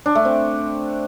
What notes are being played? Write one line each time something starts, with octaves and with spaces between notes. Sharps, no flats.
D4
A3
C4